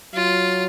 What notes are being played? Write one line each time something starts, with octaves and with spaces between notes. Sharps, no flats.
F#3 F4